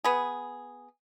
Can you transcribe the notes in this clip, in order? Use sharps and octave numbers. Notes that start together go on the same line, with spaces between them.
B3 G#4